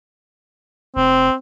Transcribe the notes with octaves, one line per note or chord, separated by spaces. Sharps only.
F1 C4